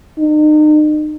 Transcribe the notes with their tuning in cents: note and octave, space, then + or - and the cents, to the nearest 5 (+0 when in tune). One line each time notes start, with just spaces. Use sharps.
D#4 -40